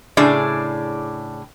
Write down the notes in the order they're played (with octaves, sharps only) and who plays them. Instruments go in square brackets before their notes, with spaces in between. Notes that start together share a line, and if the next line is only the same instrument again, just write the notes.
[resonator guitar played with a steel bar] A2 C#3 D4 G#4 D5